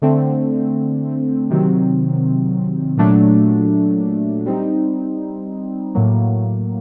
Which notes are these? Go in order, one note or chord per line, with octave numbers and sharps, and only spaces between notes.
D3 A3 C4
C3 D#3 F#3 C4
A#2 F#3 A3 D4
G3 C4 D#4
A2 F#3 A#3